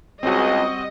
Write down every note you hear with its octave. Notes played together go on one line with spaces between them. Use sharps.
C#2 G3 C4 F#4 D#5